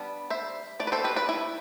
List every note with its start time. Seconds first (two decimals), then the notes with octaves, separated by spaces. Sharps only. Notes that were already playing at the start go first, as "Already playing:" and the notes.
Already playing: G3 B3 D4
0.30 C5 E5
0.80 E3 A3 D5
0.87 B4
0.92 A4 C5
1.04 G4 B4
1.16 B4 D5
1.29 E4